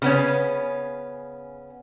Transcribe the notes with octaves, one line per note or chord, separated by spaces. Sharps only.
C#3 B3 C#4